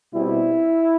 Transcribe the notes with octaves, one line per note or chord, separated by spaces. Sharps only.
B2 G3 C4 E4